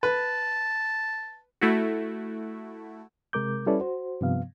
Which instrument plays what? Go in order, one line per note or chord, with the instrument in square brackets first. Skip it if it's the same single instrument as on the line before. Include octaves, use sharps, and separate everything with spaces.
[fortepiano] B4 [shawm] A5
[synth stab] A3 E4 F#4
[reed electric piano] C3 G#3 A#4 D6 G6
G3 C#4 E4 A4 B4 D5
F#4 C5
G2 C3 F3 B3 F5